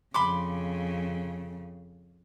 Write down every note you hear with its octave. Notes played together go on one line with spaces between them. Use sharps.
F2 C#3 B5 C6 D6